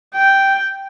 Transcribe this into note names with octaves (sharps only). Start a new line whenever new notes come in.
G5